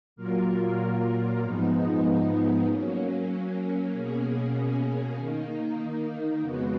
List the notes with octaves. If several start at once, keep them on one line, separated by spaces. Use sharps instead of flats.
A#2 F#3 A#3 F4 A#4
G#2 F3 G#3 B3 D#4
F#3 A#3 C#4
B2 A#3 C#4 G#4
D#3 A#3 D#4
F2 C#3 G#3 B3 F#4